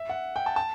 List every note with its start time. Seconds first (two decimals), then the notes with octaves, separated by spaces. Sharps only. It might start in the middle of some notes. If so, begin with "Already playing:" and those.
Already playing: E5
0.10 F#5
0.36 G5
0.46 A5
0.56 A5